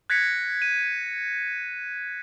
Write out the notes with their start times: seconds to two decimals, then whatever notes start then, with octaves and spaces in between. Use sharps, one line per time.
0.10 F#6 G#6 A#6 B6 C#7
0.62 D#7